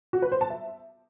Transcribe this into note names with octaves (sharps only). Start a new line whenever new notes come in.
F#4
B4
C5
A5
E5